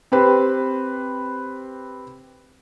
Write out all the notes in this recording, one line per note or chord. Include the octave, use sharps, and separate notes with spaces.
C4 G4 B4 C5